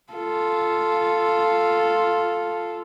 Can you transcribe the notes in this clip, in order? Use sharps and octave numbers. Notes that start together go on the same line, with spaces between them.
F4 A4